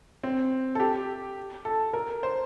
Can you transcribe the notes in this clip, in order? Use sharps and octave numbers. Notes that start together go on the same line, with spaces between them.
C4
A4
G4
A4
A#4
C5